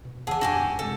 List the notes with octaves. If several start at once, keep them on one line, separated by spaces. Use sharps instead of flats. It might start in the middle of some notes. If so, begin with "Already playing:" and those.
B2
E2 C#3 E3 D4 G#4 F#5 A5 E6
F#2 D4 F#4 G4 G#5
G1 C#2
C3 G3 G#3 A4